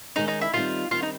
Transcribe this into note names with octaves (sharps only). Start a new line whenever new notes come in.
D#3 G#3 C#4 D#4
D#4
E4
D#3 G3 C4 F4
D#3 G3 C4 F4
D#4